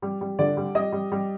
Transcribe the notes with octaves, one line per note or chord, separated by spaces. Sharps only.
G3
G3
D3 D5
G3
G3 D#5
G3
G3